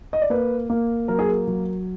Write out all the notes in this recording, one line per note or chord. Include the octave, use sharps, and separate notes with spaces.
D#5
D5
A#3 B4
A#3
F#3 A#4
G#4
A#4
F#3